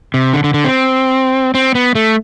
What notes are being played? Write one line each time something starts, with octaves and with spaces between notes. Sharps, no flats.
C3
D3
D3
D3
C4
C4
B3
A3